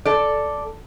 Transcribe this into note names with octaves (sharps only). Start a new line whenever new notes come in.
A4 D5